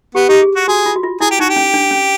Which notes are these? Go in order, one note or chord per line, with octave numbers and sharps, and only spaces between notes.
B3 G4
D#4 G4
G#4
F#4
F#4 G#4
F4
F#4
F4
E4 G#4
G4
D#4 F#4
G4
C#4
D4
C#4